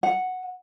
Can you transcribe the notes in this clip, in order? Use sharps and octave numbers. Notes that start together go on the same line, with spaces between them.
F#5